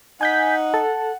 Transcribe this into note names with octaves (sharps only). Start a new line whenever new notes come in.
D#4 F#5 G#5 G6 B6
A4 A5